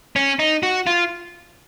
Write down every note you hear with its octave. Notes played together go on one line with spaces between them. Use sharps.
C#4
D#4
F#4
F4